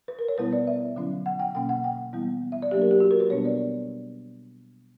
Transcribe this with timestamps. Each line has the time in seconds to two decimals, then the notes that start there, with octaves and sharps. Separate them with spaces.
0.08 B4
0.19 A#4
0.28 C#5
0.38 B2 G3 B3 E4 B4
0.53 D5
0.67 E5
0.96 D3 F#3 C#4 E4
1.26 F#5
1.40 G5
1.55 B2 A#3 C#4 G5
1.69 F#5
1.84 G5
2.13 E3 G3 B3 E4
2.52 E5
2.62 D5
2.71 F#3 A#3 D4 G4
2.82 A#4
2.91 G4
3.00 F#4
3.11 A#4
3.20 B4
3.30 B2 G3 B3 D4 C#5
3.45 D5